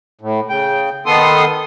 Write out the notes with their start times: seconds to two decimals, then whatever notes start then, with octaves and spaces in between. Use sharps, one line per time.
0.21 A2
0.49 C#3 G5
1.06 D#3 B3 A4 C6 D#6